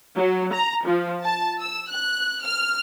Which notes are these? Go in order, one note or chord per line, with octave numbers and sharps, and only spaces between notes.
F#3
A#5
F3
A5
E6
F#6
F6